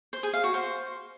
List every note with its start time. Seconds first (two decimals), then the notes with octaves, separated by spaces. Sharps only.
0.13 C5
0.23 G#4
0.33 F5
0.44 F#4
0.54 C5